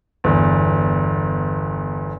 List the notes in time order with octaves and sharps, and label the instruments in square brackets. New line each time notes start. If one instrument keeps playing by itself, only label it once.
[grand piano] G1 E2